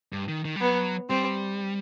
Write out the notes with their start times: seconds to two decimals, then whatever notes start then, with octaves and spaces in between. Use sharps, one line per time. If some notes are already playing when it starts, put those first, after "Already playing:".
0.12 G2
0.29 D#3
0.45 D#3
0.56 G3
0.61 F#3 B3
1.10 G3 C4